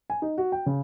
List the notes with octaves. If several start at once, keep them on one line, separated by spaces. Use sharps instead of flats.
G#5
D#4
F#4
G5
C#3